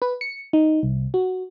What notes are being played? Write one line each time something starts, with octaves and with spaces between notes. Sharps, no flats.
B4
C#7
D#4
C2
F#4